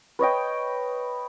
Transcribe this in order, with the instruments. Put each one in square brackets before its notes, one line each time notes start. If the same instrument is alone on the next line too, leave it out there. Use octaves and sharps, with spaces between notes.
[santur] B4 C#5 D#5 G5